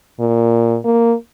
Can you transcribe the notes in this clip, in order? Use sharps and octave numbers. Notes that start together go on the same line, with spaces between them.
A#2
A#3